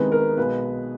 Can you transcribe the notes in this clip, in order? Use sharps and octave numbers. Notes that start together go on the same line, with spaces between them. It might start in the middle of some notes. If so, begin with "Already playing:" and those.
Already playing: C2 C3 D#3 G#3 B3 B4
A#4
B1 B2 G#3 B3 B4